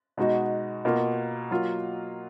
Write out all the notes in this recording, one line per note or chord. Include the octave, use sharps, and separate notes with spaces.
B2 G#3 D#4 F#4
B2 A#3 F4
F#3 A#3 F4